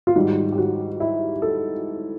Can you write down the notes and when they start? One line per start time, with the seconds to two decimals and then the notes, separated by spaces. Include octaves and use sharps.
0.07 F4
0.16 G#2 D#3 G3 F#4
0.53 G4
0.58 F#4
1.00 E4
1.42 A4